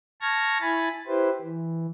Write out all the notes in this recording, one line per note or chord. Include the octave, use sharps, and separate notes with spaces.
A5 C#6 F6 G#6 A#6
E4 G#5 B5 A6
E4 G4 B4 C5
E3